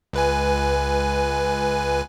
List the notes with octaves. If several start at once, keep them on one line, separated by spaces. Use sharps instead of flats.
C#2 B4 G#5